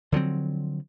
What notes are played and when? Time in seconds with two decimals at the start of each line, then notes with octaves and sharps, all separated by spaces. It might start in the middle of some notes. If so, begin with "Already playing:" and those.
0.12 D3 F3 F#3 C4